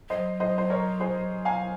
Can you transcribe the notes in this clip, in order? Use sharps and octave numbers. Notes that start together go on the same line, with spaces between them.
F#3 C5 D#5
C5 D#5
C5
A#4 C#5
G#4 C5
F5 G#5